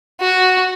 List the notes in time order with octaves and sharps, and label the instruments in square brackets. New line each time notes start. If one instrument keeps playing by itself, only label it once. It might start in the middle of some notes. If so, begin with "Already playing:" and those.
[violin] F#4